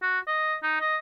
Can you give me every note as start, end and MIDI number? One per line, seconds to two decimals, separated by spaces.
0.02 0.19 66
0.27 0.56 75
0.63 0.78 63
0.81 0.97 75